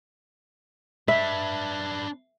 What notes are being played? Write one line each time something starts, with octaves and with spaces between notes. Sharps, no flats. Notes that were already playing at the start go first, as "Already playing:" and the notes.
D4 B4 E5